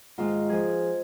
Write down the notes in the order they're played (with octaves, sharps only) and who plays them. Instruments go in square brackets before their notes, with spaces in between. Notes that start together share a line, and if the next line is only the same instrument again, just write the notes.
[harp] G#2 D#3 G#3 F4
F3 G#4